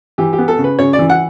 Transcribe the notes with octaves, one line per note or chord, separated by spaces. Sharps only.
E3 G4
G4
B3
A4
C#3
B4
C#3 C#5
D5
E3
F#5